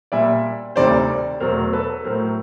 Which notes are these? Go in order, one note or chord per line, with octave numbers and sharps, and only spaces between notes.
A#2 G3 D5 E5
D2 C3 D#3 G3 C5 D5
E2 B2 F#3 A3 A#4 C5
A4 B4
A2 F#3 A3 A#4 C5